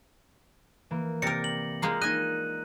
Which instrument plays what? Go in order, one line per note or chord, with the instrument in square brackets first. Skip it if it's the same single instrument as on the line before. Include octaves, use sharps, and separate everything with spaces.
[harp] E3 A#3
[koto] C3 A#4 [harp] D5 G5 [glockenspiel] A#6 C#7
[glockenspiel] F#7
[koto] G#3 A#3 F4 [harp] A#5 F6 G6
[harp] A#3 D#4 [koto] D#5 G#5 [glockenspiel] F#6 D#7